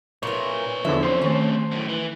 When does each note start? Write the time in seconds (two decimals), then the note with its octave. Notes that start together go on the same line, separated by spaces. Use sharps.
0.23 A#2 E4 A#4 B4 C#5
0.85 E2 D3 F3 E5
1.03 C3 C#4 C5 C6
1.22 D#3 A3 A5
1.72 F#2 A2
1.88 E3